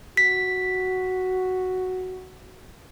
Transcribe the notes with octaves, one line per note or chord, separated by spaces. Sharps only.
F#4 B6